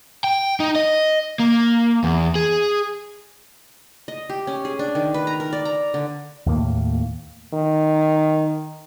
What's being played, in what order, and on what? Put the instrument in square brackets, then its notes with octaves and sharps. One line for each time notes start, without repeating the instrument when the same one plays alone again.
[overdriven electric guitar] G5
D#4
D#5
A#3
E2
G#4
[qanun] D#5
G4
C#4
G#4
D4
D#3
B4
A#5
A#4
D5
A#5
D3
[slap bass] D#2 A2 A#3
[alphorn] D#3